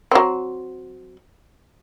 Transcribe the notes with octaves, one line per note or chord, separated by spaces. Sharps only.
F#3 C4